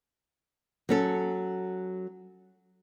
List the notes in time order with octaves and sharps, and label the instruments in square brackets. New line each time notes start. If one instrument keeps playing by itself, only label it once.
[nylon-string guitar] F#3 C#4 A4